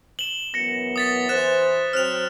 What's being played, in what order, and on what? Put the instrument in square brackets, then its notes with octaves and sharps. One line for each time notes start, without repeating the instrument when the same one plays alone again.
[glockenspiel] E7 F#7 [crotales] G7
[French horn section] F#2 E3 B3 [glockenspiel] A#6 C#7
[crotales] D#6 A6 B6
[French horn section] E3 C5 [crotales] F#6 E7
[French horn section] F#3 C4 C5 [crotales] F6 F#6 F7